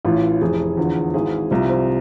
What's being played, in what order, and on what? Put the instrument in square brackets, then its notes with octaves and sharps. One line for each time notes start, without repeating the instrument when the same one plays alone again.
[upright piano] A1 A2 E3 F4
F1 F2 E3 G#4
E2 D3 F3
G#1 G#2 E3 G#4
C2 C3 F3 F4
C4